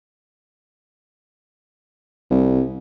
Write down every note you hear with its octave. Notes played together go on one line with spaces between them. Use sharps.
C2